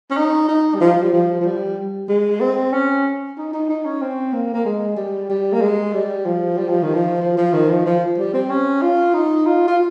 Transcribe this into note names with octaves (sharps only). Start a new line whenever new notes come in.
C#4
D#4
D#4
G3
F3
G3
F3
F3
G3
G#3
C4
C#4
D#4
D#4
D#4
C#4
C4
A#3
A#3
G#3
G3
G3
A#3
G#3
G3
F3
G3
F3
D#3
F3
F3
F3
D#3
F3
F3
G3
C4
C#4
F4
D#4
F4
F4